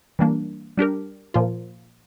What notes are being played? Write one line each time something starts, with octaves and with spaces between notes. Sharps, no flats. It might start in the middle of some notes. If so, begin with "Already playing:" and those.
E3 G3 A#3 D4
G3 D4 G4 A#4
A#2 F3 A#3 F4